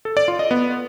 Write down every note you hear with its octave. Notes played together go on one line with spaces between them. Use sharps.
A4
D5
F4
D#5
B3